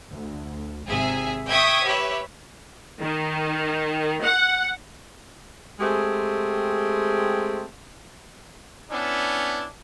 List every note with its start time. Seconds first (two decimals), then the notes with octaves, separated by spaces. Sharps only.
0.12 D2
0.87 G#1 C3 G#4 E5 G#5
1.48 E5 G5 C#6 D#6 G#6 B6
1.85 G4 B4 C#5 E5
3.01 D#3
4.24 F#5
5.80 G#3 A3 C4 G4 G#4
8.91 B3 C#4 D4 E4